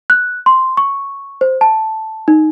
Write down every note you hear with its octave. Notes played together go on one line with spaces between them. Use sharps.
F#6
C6
C#6
C5
A5
D#4